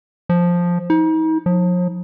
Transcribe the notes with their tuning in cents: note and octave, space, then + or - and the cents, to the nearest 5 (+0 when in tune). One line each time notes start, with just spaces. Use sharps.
F3 +5
D#4 +40
F3 +40